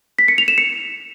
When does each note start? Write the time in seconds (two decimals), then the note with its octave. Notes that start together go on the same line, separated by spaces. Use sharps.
0.19 B6
0.28 C#7
0.38 F7
0.48 E7
0.58 C#7